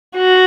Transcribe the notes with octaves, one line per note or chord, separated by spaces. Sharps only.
F#4